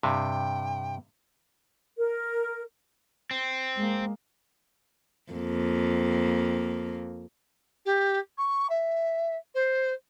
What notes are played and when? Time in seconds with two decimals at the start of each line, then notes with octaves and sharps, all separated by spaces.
0.03 G2 C3 G5
1.98 A#4
3.31 C4
3.77 G#3 A#3
5.32 F2 A#3
7.85 G4
8.37 C#6
8.69 E5
9.54 C5